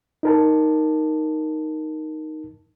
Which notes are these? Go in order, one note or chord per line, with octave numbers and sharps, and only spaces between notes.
D#4 A#4 A5